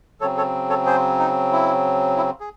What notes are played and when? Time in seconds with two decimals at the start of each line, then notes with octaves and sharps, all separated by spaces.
0.21 C#3 F#3 C4 A4 C#5
0.37 A4 C#5
0.69 A4 C#5
0.86 G#4 C5
1.19 D#4
1.52 E4
2.17 E4
2.41 G#4